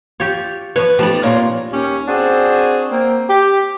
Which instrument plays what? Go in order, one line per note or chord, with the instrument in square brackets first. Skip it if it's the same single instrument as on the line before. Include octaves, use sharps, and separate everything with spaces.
[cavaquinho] F4 [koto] G4 C#5
[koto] F3 C#5 [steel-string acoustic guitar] B4
[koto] F3 D5 [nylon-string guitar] A3 B3 D#4 [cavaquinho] G4 B5
[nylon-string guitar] A#2 [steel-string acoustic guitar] A#3 C4 D4 [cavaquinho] C#5 A#5 C6
[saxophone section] D#2 C#4 G4
C4 D4 F#4 G#4
A#3 C4
G4